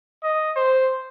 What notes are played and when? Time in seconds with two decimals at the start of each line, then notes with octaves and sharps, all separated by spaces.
0.23 D#5
0.56 C5